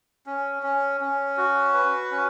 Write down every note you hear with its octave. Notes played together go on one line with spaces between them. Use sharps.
C#4
C#4
C#4
F#4
B4
C#4